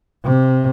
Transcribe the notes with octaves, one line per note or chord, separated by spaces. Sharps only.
C3